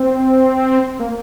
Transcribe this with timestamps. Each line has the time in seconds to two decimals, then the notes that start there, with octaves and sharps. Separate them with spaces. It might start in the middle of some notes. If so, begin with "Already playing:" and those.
Already playing: C4
1.00 A#3